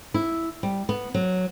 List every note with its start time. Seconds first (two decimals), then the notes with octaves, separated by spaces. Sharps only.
0.14 E4
0.63 G3
0.89 B3
1.14 F#3